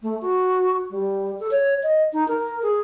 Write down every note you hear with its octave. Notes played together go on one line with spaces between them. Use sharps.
A3
F#4
G3
A4
C#5
D#5
D#4
A#4
G#4